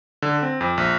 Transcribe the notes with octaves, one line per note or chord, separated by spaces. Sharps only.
D3
C4
F2
A#1